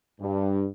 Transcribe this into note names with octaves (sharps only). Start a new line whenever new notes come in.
G2